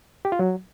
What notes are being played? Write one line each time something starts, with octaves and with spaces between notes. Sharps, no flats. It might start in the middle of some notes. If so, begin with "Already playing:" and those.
G4
F4
F#3